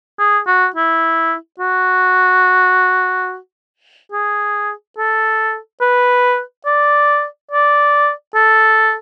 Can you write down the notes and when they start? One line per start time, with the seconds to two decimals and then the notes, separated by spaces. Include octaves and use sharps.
0.19 G#4
0.47 F#4
0.76 E4
1.60 F#4
4.12 G#4
4.98 A4
5.81 B4
6.66 D5
7.51 D5
8.35 A4